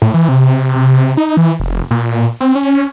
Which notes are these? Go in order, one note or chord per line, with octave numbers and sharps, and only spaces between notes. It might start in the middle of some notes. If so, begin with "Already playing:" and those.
A2
E3
C3
C3
D#4
E3
F1
A#2
C4
C#4